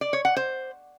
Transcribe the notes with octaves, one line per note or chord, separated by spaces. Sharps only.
D5
C#5
F#5
C5